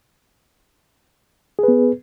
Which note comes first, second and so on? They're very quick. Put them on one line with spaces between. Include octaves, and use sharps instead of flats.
G#4 B4 B3